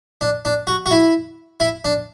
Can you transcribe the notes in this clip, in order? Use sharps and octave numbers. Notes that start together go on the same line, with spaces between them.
D4
D4
F#4
F#4
E4
E4
D4